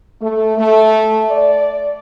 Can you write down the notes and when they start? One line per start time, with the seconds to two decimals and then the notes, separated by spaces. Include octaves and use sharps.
0.20 A3
0.58 A3
1.31 D5